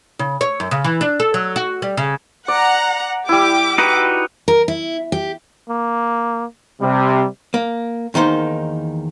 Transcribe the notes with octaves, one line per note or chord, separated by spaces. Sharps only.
C#3
C#5
F#2
C#3
E3
D4
A4
F#3
F#4
G3
C#3
D5 F#5 A#5
G3 E4 G4 D6
D#4 F#4 B4
A#4
E4
G4
A#3
C3 G3
A#3
E2 D#3 A#3 D#4 C5